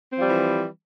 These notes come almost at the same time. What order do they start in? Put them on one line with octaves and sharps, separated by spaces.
C4 F3 G3 E3